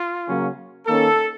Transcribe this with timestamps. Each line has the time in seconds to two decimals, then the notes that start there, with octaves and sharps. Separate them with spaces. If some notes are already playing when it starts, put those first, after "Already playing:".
Already playing: F4
0.28 C#3 F#3 A#3 C#4
0.87 D#3 A#3 C#4 A4